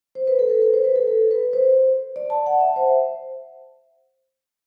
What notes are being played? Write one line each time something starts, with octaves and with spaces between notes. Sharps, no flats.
C5
B4
A4
A4
B4
C5
B4
A4
A4
B4
C5
D5
A5
F#5
E5
C5